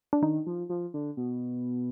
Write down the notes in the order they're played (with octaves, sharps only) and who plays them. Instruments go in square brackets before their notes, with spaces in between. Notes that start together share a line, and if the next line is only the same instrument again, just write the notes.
[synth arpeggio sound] D4
[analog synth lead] D#3 [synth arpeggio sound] D#4
[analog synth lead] F3
F3
D3
B2